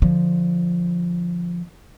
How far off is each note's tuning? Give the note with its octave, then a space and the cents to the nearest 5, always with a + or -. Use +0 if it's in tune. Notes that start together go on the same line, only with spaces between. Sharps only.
D3 +0 F3 +0